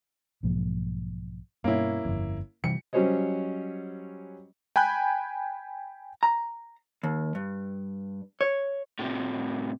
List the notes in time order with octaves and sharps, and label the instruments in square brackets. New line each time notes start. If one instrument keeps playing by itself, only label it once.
[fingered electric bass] B1 G#2 F3 A#3
[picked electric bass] G2 B2 [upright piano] A#3 C#4 E4
[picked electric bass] G1 F2
[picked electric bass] C3 E3 G3 [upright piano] C#7
[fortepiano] F#3 G3 C#4 C5 C#5 D#5
[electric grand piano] G5 G#5 B5 F#6 G6
[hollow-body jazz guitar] A#5
D#2
G2
C#5
[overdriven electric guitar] A2 C3